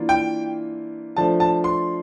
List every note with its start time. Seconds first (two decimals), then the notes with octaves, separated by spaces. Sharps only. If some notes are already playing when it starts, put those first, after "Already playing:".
Already playing: E3 A#3 D4 F4
0.09 G5
1.16 F3 A3 D4 A5
1.40 A5
1.64 C6